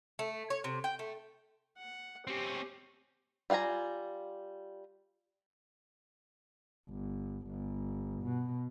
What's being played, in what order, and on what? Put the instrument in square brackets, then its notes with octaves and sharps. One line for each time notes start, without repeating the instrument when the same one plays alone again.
[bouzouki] A3
C#5
C3
G5
A3
[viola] F#5
[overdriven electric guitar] C4 C#4 [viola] G4
[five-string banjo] G3 F4 F#5 G#5 A#5
[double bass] G1
G1
B2